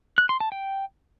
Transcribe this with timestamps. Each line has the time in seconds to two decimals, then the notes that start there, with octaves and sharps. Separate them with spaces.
0.18 F#6
0.29 C6
0.40 A5
0.52 G5